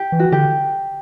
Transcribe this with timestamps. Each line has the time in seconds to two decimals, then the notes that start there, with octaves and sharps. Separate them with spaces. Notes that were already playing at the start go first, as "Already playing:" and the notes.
Already playing: G4
0.12 E3
0.19 F#4
0.32 D3 G4